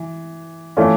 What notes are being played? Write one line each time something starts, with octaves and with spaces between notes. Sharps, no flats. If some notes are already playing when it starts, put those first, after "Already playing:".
Already playing: E3
E3 A3 C#4 F4